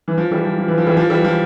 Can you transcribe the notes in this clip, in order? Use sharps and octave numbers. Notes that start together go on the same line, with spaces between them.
E3
F3
E3 G3
F3
F3
E3
F3
E3 G3
F3
E3 G3
F3